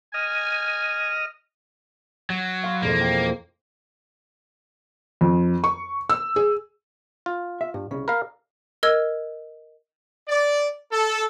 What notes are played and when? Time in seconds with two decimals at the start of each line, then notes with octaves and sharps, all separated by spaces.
0.14 D#5 G#5 F6
2.30 F#3
2.64 F5 B5 C6
2.82 E1 F2 A#3
3.01 G5
5.21 F2
5.64 C#6
6.10 E6
6.36 G#4
7.26 F4
7.61 E5
7.74 G2
7.91 C2 C#3
8.08 A#4 F5 B5
8.83 A#4 D#5 E6 G#6
10.28 D5
10.92 A4